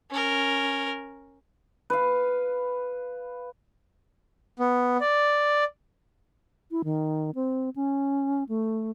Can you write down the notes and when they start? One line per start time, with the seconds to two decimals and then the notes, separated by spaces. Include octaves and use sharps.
0.11 C#4 A#4
1.90 B4 F5
4.59 B3
5.00 D5
6.71 E4
6.84 D#3
7.35 C4
7.76 C#4
8.49 A3